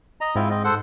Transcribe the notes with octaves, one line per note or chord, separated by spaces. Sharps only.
D#5 A#5
G#2 C4 E4 F4
C4 D#5
A4 C5 F#5